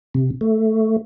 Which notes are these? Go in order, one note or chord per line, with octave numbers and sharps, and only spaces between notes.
C3
A3